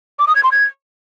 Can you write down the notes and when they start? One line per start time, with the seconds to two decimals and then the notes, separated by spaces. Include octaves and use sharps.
0.19 D6
0.27 D#6
0.35 G#6
0.43 C6
0.52 G#6